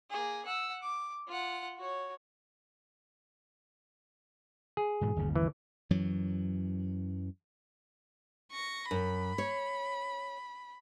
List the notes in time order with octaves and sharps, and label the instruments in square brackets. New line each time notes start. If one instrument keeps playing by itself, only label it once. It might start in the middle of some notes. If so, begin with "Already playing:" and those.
[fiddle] A#3 G#4
F#5 E6
D6
F4 F#5
F#4 C#5
[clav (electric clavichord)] G#4
[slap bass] G#2 B2 E3
G1 D#2 C#3
[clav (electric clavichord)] E3
[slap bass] F#2 E3 F#3
[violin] C#6 A#6
[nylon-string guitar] F#2 [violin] B5
[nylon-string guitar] C#5